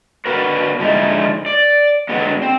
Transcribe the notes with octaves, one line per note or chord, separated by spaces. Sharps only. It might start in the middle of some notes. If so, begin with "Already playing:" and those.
D3 B3 F#4 A#4 B4
D3 F3 G#3 D#4 E4
D5
D3 F#3 G#3 B3
C4